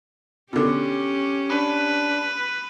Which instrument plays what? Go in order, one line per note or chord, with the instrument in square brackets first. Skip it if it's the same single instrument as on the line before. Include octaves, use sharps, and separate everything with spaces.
[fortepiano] B2 D3 [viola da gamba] C#4 G4
[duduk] D4 [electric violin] B4